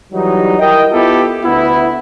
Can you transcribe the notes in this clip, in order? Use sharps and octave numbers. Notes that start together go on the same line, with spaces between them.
E3 F#3 G3 D#4
E4 A#4 D#5 G5
B3 E4 F4 G4 A4
D2 B3 E4